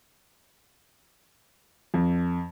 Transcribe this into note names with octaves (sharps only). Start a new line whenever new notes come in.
F2